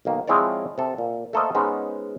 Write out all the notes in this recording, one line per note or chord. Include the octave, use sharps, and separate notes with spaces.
B1 D#3 A#3
F3 G#3 C4 E4 C#5 D5
C3 A4
A#2
A3 A#3 A4 A#4 C5 D#5
G#3 B3 C#4 D#4 C5